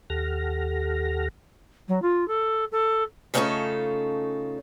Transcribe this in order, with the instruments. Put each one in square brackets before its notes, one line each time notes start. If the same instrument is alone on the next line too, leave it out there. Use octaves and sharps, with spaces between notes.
[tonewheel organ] D#2 G4 A4 F#5 F6 A#6
[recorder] F#3
F4
A4
A4
[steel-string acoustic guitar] C#3 A3 C#4 D#4 F4 A4